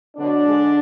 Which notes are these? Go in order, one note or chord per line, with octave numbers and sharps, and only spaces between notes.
B2 D3 F#3 D4
G#2 G#3